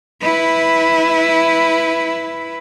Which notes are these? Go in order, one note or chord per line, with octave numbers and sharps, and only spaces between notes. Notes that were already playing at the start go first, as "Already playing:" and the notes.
E4 B4